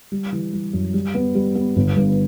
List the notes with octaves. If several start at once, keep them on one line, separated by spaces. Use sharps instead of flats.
G3
E3
G3
F#2
G3
B3
G3
B3
G1
G2